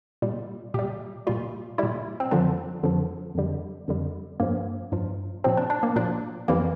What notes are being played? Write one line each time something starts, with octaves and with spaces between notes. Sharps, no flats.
A#2 G3
A#2 G3 G4
A#2 G3 F4
A#2 G3 E4
C4
F2 D3 F3 D4
F2 D3 F3
F2 D3 G3
F2 D3 G3
G2 F3 A#3
G2 F3
A#2 F3 C4
D4
D4
A#3
A#2 F3 D4
F2 E3 G3 A#3